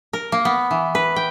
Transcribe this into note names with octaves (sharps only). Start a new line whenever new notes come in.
A#4
A#3
B3
E3
B4
G5